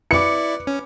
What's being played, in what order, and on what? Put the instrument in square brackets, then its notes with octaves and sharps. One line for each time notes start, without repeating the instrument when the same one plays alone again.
[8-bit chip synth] E4 D5 [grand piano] B4 D6 [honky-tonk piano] C#7
[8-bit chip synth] C#4